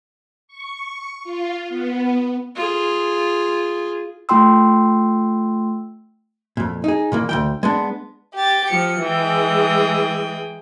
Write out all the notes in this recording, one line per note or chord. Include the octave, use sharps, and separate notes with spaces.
C#6
F4
B3
F4 G#4
A3 F4 G5 C6 E6
F2 A#2
D#4 G#4
A#2 E3 A#3
D2 C#3 G5
G#3 B3 D4
G4 A6
F3 C#7
E3 G#3 G#4 G5